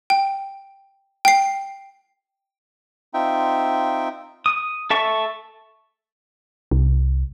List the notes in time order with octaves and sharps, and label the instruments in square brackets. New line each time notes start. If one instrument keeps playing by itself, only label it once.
[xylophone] G5
G5 C7
[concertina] C4 D#4 F4 E5 G5
[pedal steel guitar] D#6
A4 E5 A5 C#6
[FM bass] C2